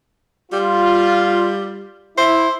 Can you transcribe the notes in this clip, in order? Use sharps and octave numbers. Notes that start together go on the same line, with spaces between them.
G3 F4
E4 C5